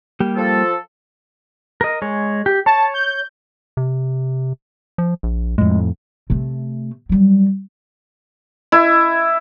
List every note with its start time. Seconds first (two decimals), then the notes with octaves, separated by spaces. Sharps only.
0.20 G3 A#3 G4
0.37 F3 A4
1.81 A#4 D#5
2.02 G#3 C#5
2.46 G4
2.66 C#5 A5
2.94 G6
3.77 C3
4.98 F3
5.23 A#1
5.58 F2 A2 G#3
6.30 C3 A3
7.09 F#3 G3
8.72 E4